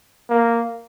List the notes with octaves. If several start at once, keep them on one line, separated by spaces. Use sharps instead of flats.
A#3